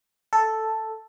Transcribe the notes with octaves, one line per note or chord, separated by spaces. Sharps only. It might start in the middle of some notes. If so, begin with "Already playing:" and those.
A4